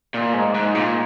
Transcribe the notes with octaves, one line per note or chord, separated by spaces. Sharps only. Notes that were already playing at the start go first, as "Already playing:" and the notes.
A#2
G#2
G#2
A#2